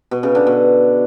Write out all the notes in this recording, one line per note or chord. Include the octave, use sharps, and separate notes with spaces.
B2
C#3
D3
B2